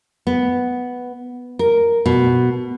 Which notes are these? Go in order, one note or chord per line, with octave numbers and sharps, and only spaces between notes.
B3
A#4
B2